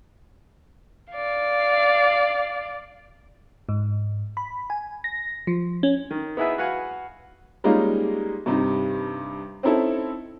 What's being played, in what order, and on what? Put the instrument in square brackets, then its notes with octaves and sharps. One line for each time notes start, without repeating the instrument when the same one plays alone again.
[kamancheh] D5 F5
[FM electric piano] G#2
B5
G#5
A#6
F3
C#4
[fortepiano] D#3
B3 D#4 E4 G#4 B4 E5
F#4 B4 F5 F#5 G#5
[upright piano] G3 G#3 A#3 C#4 D#4 F4
G2 C3 D#4
C4 C#4 D#4 E4 A4